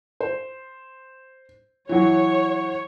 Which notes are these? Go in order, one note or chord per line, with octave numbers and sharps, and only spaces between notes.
C5
E3 F#3 C#5